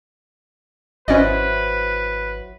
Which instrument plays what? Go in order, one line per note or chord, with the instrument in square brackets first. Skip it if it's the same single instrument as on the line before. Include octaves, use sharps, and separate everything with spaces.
[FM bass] G#1 [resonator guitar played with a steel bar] F#3 E4 C5 [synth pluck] C#4 D5 D#5 [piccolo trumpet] B4